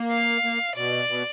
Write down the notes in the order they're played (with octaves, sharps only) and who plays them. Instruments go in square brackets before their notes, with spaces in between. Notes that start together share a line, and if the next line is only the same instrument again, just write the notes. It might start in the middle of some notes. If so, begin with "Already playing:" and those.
Already playing: [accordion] A#3
[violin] F5
[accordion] A#3
[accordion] B2 [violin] D5
[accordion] B2